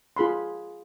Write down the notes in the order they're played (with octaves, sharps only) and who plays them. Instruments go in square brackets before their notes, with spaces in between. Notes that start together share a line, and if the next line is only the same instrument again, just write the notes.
[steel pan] F4 G#4 B5 C6